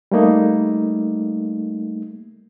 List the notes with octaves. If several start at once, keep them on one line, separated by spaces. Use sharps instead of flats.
G3 A3 A#3 D#4